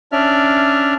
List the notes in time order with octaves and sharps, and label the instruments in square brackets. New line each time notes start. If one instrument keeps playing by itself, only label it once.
[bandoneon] C#4 D4 D5 E5 F6